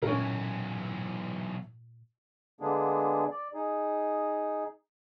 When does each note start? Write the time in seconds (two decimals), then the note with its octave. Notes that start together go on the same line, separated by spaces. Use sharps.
0.03 B1 A#2 E3 C#4 A#4
2.61 D3 G#3 A#3 B3 D4 G#4
3.31 D5
3.54 D#4 G#4